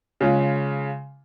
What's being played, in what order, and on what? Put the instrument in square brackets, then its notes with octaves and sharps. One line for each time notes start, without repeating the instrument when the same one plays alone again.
[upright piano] C#3 G#3 C#4 F4